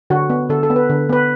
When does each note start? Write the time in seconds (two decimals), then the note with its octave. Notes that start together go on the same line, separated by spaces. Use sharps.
0.10 D3 F#4
0.30 B3
0.49 D3 A4
0.63 A4
0.70 B3
0.76 B4
0.90 D3
1.09 B3 B4